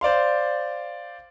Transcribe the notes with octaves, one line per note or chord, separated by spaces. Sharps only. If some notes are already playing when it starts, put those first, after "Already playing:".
C5 D5 F5 C6